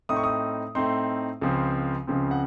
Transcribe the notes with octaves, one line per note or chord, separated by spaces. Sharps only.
A2 A3 C4 D#4 D#6
C#6
D#6
A2 A3 C4 D#4 C6
C#2 C#3 F3 C4
C#2 C#3 F3 C4
F#5